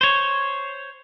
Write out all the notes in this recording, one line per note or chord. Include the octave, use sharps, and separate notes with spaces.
C5 C#5